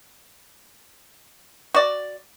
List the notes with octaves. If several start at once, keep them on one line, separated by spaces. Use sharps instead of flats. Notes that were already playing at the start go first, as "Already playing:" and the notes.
F#4 D5